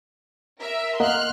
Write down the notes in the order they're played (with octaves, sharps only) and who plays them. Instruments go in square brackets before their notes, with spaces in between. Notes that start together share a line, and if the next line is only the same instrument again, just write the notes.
[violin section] A#4 E5
[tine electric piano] A#3 [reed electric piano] A#4 D#5 F#5 [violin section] C6 F6 F#6